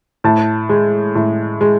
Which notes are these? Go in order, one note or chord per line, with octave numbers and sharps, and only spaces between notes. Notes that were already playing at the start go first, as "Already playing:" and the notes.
A2 A5
G#3
A2
G#3